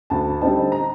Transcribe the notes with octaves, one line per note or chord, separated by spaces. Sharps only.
D2 A5
D3 G3 C4 D#4 A5
A#5